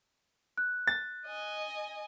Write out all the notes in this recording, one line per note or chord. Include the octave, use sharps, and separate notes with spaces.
F#6
A6
D#5 G#5